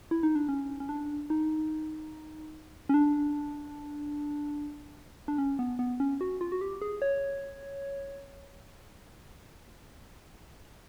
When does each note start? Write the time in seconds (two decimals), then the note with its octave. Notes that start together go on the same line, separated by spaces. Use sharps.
0.11 E4
0.23 D#4
0.35 D4
0.49 C#4
0.80 C#4
0.89 D4
1.30 D#4
2.89 C#4
2.94 D4
5.28 D4
5.38 C#4
5.59 B3
5.79 B3
6.00 C#4
6.21 F#4
6.41 F4
6.52 F#4
6.61 G4
6.82 G#4
7.02 C#5